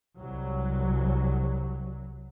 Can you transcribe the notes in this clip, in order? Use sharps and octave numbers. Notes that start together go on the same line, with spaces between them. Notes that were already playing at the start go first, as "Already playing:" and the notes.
C2 F#3